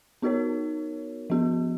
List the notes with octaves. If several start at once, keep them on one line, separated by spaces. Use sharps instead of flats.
B3 D#4 F#4 A#4 C#5
F3 B3 F#4